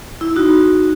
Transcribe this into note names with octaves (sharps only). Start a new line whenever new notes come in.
E4
D#4 F#4